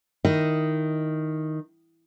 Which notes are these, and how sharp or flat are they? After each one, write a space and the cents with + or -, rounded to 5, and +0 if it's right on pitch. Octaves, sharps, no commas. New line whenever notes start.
D#3 +0 E4 +0 D#5 +0